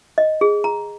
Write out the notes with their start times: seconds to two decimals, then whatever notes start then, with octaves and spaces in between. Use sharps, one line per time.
0.18 D#5
0.41 G#4
0.64 A#5